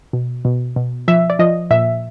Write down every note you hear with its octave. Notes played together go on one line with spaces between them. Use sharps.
B2
B2
B2
F3 E5
D5
F3 D#5
A#2 E5